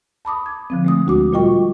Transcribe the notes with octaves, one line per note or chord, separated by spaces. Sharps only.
A5 B5 D6 D#6
G#6
D3 F3 C4
G#3 A3 D#6
D2 F#4 D6
A#2 G3 F4 D#5 G5 C#6